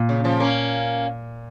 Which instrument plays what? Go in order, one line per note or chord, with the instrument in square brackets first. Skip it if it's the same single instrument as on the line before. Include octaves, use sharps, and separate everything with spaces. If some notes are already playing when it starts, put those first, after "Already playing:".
Already playing: [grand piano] A#2
[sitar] C#3
C#3 F3
A#3 C#4